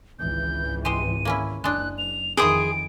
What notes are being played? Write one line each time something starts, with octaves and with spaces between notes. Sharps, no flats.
G#1 C#2 E3 G6
G#3 G4 C5 D#7
A#3 C#4 E4
F#1 G#3 D4 F#6
F7
F2 D#3 E3 G#4 G5 C6 D#6 D7